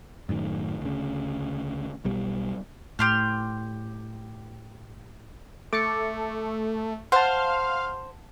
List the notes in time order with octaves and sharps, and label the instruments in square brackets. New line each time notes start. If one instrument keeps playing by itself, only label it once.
[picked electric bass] F#2 A2 D#3
D2 C#3
B1 B2 G3
[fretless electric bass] A2 [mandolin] G4 C6 F6
[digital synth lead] A3 [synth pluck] D6 A6 C#7
[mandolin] C5 [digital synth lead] F5 [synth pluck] F#5 A5